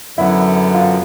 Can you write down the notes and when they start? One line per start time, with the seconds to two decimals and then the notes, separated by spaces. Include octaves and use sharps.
0.17 F#2 D3 F#3 B3 E4
0.74 F4